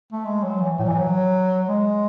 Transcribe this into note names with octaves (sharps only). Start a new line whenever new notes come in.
A3
G#3
F#3
E3
A2
F#3
E3
F#3
G#3